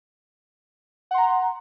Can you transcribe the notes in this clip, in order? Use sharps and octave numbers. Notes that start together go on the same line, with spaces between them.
F#5 A#5 C6